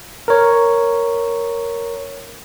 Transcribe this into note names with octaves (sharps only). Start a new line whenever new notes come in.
A#4 C#5